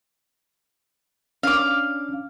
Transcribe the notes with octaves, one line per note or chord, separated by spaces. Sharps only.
C#4 D4 F5 D6